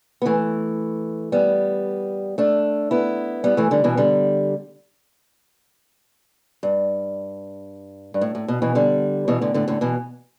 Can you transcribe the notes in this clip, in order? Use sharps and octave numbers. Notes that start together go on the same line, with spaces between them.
B3
E3 A3
G3 B3
A3 D4
B3 E4
G3 B3
E3 A3
D3 G3
B2 E3
D3 G3
G2
G2
A2
A2
B2
B2 E3
D3 G3
B2 E3
A2 D3
A2 D3
A2 D3
B2 E3